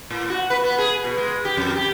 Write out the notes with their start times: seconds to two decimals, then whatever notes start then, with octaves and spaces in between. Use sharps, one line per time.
0.10 A2
0.30 F#4
0.50 B4
0.64 B3
0.78 G#4
1.04 B2
1.18 G#3
1.45 G4
1.57 F2
1.75 G4